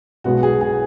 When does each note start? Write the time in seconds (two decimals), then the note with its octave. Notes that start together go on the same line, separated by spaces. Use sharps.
0.24 B1 B2 G#3 B3 F#4
0.43 G#4
0.61 G#4